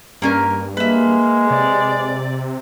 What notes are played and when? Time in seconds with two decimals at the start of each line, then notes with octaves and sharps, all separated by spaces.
0.22 G2 A#3 C#4 A#4
0.77 G#3 A#3 B4 E5
1.50 C3 D5